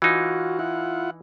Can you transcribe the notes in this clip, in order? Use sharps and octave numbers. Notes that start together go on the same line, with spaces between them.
E3 D#4 F4 F#4
E4 F4 F#5